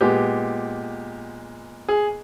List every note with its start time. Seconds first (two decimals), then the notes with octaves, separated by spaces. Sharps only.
0.01 A#2 G#3 B3 G4
1.89 G#4